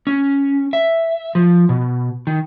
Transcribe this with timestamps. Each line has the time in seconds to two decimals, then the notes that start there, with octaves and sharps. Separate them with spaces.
0.07 C#4
0.73 E5
1.35 F3
1.69 B2
2.27 D#3